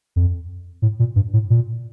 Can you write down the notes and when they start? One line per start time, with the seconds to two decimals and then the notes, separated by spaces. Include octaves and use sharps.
0.16 F2
0.82 A2
1.00 A#2
1.16 G2
1.33 A2
1.50 A#2